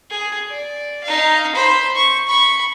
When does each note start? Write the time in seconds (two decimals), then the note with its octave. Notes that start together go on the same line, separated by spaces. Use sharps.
0.10 G#4
0.50 D5
1.04 D#4 F5
1.55 C5 B5
1.96 C#6
2.27 B5 C#6